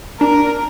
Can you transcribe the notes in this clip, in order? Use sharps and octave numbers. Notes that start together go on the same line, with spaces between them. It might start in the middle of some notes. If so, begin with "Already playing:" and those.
D4 A#4